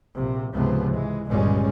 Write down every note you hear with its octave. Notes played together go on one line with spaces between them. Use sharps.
A#1 C3
C#2 G#2 C3 F3 B3
E3 G#3
G1 C#2 A#2 G3 G#3 C#4